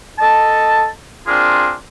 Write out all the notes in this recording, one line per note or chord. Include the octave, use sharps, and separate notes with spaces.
A4 D#5 A5
C4 D4 F4 G#4 A#4